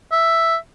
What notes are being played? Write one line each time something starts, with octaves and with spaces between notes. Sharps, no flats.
E5